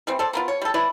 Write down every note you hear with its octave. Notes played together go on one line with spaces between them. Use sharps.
E3 G3 C4
A4 C5 D5
A#3 B3 F4
C#5
G3 A4
E4 B4 D5